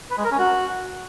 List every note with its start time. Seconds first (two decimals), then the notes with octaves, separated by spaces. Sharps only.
0.11 B4
0.18 G#3
0.25 A#4
0.32 C#4
0.39 F#4